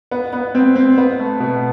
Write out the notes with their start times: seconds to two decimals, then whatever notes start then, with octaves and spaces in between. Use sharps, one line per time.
0.11 B3
0.33 B3
0.55 C4
0.76 C4
0.98 B3
1.20 A3
1.40 B2